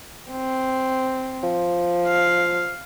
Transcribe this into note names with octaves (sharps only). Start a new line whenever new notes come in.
C4
F3
F5